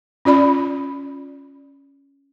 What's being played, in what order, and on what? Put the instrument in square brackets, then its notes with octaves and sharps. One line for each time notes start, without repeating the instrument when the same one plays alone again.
[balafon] C#4 F4 D5 B5